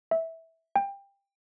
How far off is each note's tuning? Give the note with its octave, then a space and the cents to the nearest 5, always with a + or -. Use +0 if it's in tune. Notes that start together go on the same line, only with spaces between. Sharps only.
E5 -15
G5 +20